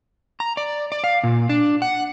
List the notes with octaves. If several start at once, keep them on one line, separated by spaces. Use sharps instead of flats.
A#5
D5
D5
F5
A#2
D4
F#5